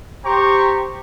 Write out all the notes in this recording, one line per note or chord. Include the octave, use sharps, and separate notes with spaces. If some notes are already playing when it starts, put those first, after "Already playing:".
G4 C5 G5 A#5 C#6